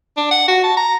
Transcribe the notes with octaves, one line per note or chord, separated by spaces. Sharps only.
D4
F#5
F#4
A5
A#5